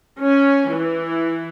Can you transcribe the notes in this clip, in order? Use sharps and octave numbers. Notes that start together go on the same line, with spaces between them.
C#4
E3